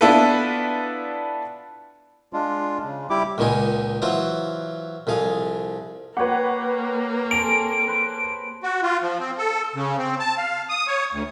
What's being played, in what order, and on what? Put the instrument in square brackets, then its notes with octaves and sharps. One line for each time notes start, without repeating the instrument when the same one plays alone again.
[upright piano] B3 D4 E4 F4 A4 B4
[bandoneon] G#3 D4 F4
C#3
G3 E4 G4 D6
[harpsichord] C#2 A#2 D#3 D#4 G#5
E3 F#3 F4 C5
C2 F2 G#4 F5
[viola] A#3 [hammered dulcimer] G4 C#5 [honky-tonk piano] B4 F#5
[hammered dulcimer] C4 G#4 A4 [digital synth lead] D7 [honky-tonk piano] F7
[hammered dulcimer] B4 C5
[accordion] F#4
F4
F3
C4
A4
C#3
C4
A5
F5
D#6
C#5
D2